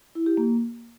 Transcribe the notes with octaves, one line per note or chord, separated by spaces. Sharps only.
E4
G4
A#3